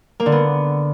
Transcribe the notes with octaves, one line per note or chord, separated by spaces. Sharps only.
A#3
D3
B3